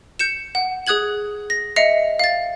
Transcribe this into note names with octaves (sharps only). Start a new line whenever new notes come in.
G6 C#7 E7
F#5
G#4 D#6 F#6 G#6 F#7
A#6
D#5 E5 C7 C#7 F7
F5 A6